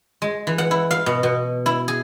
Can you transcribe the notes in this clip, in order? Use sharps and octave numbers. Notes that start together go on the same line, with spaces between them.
G#3
E3
F#5
E4
F5
B2
B2
E4
G#4